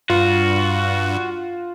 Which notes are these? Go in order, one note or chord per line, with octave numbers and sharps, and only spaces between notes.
G2 F4 F#4